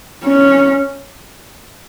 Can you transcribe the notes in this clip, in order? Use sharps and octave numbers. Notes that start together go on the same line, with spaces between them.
C#4